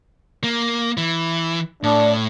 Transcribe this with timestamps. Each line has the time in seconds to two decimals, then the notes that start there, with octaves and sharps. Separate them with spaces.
0.44 A#3
0.97 E3
1.83 A2 D4